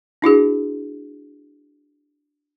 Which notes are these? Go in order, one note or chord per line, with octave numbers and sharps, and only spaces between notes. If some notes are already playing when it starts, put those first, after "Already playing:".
D4 E4 F#4 G#4